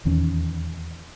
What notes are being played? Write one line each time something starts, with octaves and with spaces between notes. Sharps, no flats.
D#1 E2 D#3 C#4